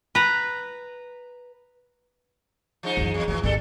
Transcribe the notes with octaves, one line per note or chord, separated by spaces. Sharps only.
B4 A#5
F3 G#3 D#4
F#2 E3
E2
F2 G#2 E3 F#3
G#1 D#2 G3 A4